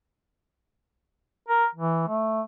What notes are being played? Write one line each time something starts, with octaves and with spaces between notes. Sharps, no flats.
A#4
E3
A3